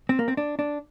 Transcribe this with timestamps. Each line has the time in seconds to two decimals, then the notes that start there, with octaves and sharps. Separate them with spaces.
0.09 C4
0.19 A#3
0.28 C4
0.37 D4
0.59 D4